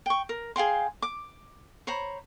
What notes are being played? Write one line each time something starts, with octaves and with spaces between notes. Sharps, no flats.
G5 C#6
A#4
G#4 F5 G5 C6
D6
C5 C#5 A#5 B5